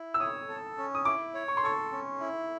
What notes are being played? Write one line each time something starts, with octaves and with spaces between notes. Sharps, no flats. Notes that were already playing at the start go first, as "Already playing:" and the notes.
Already playing: E4
E6
C#5 D#6
A4
C#4
D#6
E4 D6
C#5
C#6
C6
A4 C#6
C#4
E4